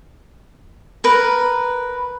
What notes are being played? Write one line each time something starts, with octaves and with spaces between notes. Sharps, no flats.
A#4 B4